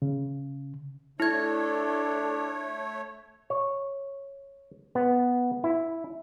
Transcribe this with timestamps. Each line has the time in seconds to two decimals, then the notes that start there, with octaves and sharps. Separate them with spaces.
0.02 C#3
1.20 A3 D4 E4 A4 C#5 G#6
3.50 C#5
4.95 B3
5.64 E4